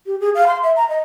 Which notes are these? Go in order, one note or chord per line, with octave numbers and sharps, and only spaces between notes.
G4
G#4
F5
C6
E5
A#5
D#5